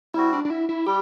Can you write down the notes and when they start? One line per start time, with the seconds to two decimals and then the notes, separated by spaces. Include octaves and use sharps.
0.14 G3 C4 E4 F#4
0.33 D4
0.45 D4
0.50 E4
0.69 E4
0.86 G3 G4